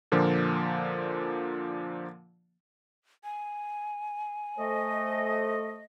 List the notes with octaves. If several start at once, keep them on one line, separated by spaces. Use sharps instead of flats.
A#2 D3 F3 A#3
G#5
A3 A4 C5 D#5